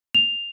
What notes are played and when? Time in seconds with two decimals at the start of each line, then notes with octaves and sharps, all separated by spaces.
0.14 F7